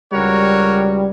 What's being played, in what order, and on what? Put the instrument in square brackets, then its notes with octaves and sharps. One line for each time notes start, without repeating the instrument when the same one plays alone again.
[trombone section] C#2 G3 [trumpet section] F#4 A#4 C#5